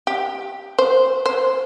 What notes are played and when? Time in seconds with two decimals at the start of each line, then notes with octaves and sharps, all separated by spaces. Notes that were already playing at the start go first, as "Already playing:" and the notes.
0.07 G4
0.78 C5
1.26 C5